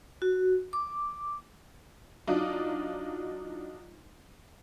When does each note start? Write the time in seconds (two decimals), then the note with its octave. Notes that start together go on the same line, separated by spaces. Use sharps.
0.22 F#4
0.73 D6
2.27 F#3 D4 D#4 F4